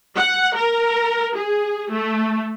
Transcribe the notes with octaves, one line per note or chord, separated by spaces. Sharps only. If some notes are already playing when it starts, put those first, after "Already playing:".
F#5
A#4
G#4
A3